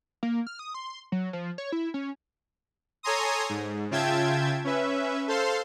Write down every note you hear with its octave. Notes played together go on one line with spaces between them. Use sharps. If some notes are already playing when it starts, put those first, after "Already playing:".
A#3
F6
D#6
C6
F#3
F3
C#5
E4
C#4
A4 C#5 G#5 A#5 C6 D#6
G#2
C#3 F4 E5 G5 A5 G#6
C#4 B4 E5
A4 C5 F5 C6